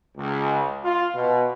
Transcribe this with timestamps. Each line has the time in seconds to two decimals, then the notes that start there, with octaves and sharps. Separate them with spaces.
0.18 C#2
0.84 F4
1.15 B2